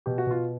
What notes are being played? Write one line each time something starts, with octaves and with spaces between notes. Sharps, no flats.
B2 G4
F#4
B2 F4